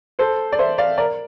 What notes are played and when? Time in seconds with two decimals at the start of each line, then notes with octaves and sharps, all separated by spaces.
0.19 A4 C5
0.52 D5
0.59 C5 E5
0.78 D5 F5
0.98 A#4 D5